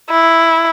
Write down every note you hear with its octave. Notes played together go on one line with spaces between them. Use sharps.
E4